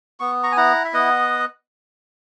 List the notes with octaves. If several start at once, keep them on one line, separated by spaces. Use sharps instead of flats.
B3 C#6
A#5 C#6
G#5
E4 F#5 A#5
E5
B3 D#5 F#5